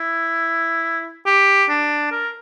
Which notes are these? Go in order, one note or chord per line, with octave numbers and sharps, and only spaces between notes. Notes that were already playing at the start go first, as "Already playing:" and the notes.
Already playing: E4
G4
D4
A#4